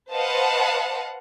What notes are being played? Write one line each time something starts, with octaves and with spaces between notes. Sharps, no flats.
B4 C5 D#5 F5 F#5 A5